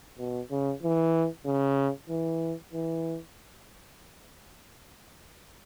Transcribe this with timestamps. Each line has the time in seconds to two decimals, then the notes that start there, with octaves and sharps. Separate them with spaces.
0.18 B2
0.51 C#3
0.82 E3
1.46 C#3
2.09 E3
2.73 E3